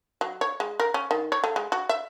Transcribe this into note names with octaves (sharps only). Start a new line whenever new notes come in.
F#3
C#5
G#3
A#4
C#4
D#3
C#5
A3
G#3
F#4
E5